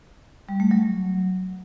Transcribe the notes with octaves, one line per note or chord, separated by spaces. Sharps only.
G3
A3
F#3